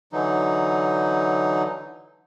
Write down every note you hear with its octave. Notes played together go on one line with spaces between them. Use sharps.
D3 E3 F#3 D#4